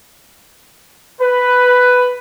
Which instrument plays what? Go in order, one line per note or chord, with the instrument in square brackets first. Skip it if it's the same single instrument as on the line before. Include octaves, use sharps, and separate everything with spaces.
[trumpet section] B4